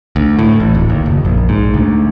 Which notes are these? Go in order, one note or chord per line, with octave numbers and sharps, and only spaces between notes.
D2
A2
A1
D1
D#2
F#1
A#1
G#2
D2